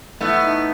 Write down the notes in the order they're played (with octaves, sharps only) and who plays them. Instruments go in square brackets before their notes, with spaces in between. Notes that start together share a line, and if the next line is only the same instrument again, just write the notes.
[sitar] A3 B3 [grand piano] E4
[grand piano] D#4